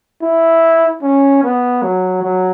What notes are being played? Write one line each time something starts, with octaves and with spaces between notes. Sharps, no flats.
E4
C#4
B3
F#3
F#3